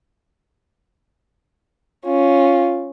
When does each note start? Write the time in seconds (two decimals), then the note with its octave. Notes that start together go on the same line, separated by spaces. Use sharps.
2.05 C#4 F4